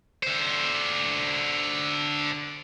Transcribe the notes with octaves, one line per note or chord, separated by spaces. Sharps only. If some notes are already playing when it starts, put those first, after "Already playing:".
D3 C5